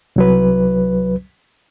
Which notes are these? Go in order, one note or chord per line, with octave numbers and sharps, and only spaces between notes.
C2 F#3 B4